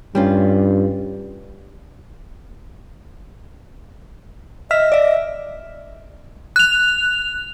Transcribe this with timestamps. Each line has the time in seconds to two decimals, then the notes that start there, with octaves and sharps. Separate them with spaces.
0.15 G2 G3 C#4 F4
4.71 D#5 E5 F6 B6
4.92 D5 E5
6.56 F#6 F7